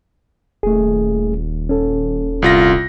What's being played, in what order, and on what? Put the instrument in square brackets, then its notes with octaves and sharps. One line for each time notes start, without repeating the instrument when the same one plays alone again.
[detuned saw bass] D#1 [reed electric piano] A3 G#4
[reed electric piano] C#4 A4
[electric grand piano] C2 F4 A#6